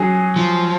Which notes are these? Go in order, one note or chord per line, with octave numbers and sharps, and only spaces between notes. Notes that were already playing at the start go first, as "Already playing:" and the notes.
Already playing: F#3 C#4 G#4
F3